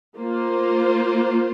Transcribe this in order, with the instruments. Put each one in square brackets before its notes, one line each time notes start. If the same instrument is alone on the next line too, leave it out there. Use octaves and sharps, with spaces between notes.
[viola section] A#3 F4 C5